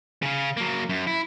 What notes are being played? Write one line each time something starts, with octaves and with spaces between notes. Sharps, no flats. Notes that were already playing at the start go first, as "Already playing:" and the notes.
C#3 C#4
F#3 A#3
F#2
E4